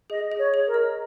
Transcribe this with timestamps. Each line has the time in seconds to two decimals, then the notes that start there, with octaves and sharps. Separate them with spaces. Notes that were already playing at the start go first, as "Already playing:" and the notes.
0.10 G#4 D#5
0.32 G#4
0.39 C#5
0.54 G#4
0.67 A#4
0.74 D#5